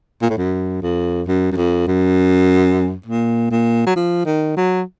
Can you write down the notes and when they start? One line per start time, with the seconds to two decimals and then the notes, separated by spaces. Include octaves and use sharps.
0.22 A#2
0.29 A2
0.37 F#2
0.82 F2
1.27 F#2
1.52 F#2
1.56 F2
1.87 F#2
3.06 A#2
3.51 A#2
3.86 F#3
3.96 F3
4.25 D#3
4.57 F#3